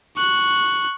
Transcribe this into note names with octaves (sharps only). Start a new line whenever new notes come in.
C#6 F#6